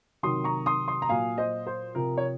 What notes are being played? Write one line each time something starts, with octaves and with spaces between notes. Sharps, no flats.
C3 D#3 F#3 C6 D#6
A#5 C#6
C6 D#6
C6 D#6
A#5
A#2 F#3 F5 G#5
C5 D#5
C5
C3 F3 A#4
C#5